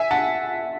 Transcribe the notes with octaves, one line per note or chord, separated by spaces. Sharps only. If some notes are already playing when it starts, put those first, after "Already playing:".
Already playing: E5 G#5
F#5 A5